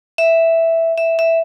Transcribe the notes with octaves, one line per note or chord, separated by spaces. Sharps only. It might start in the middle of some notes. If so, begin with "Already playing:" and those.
E5
E5
E5